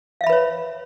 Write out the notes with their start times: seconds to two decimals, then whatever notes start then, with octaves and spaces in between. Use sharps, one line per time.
0.21 F5
0.24 E5
0.27 B5
0.30 B4
0.33 C#5